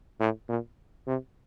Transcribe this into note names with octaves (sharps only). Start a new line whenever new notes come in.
A2
A#2
C3